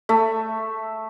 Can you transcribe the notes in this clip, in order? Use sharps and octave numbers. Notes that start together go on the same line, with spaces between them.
A3 E5